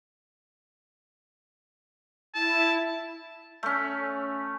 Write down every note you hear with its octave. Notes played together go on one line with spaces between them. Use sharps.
E4 A5
A3 C#4